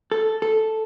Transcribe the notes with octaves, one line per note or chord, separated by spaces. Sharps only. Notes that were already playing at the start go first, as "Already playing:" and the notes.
A4
A4